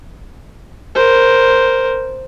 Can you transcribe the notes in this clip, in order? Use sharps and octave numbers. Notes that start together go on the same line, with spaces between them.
A#4 C5